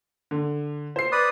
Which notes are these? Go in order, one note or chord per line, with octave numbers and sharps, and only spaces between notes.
D3
C5 C7
B4 D5 D#6